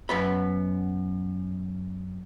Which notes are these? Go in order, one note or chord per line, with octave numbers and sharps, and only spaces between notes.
F#2 B3 B5